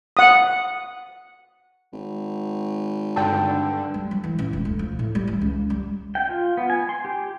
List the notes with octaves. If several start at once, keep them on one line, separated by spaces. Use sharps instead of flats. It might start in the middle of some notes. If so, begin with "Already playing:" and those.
F#5 D#6
G#1
G2 D3 G5 A5
G3
F#3
E3
A1
E1
D2
F3
A2
G3
E3
C#2
G3
G5
F4
B3
G#5
C6
G4